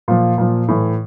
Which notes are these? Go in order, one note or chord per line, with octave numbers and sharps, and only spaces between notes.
A#2 F3
A#2 F3
A2 E3